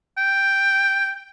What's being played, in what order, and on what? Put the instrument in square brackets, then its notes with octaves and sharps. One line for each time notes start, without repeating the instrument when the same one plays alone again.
[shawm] G5